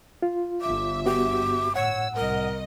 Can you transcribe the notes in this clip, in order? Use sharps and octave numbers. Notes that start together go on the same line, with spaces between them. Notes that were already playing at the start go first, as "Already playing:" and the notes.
F4
G1 E5 D6
B3 F#4 G4 D6
A2 C#5 F#5 E6
C2 A#4 D#5